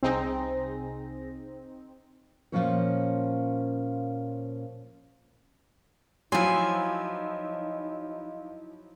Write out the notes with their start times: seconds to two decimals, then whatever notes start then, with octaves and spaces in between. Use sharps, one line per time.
0.03 C2 C4 D#4 G#4 A#6
2.52 A#2 C#3 F3 C#4 C5 C#5
6.32 F3 F#3 D#4 E4 F5 G#5 C6